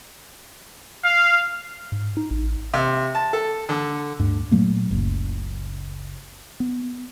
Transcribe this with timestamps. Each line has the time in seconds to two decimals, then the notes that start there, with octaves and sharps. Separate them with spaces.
1.04 F5
1.92 G#2
2.17 D#4
2.31 A1
2.74 C3
3.15 A5
3.33 A4
3.69 D3
4.20 D2 G2
4.51 A#2 F#3 A3 A#3
4.91 F#1 C#2
6.60 B3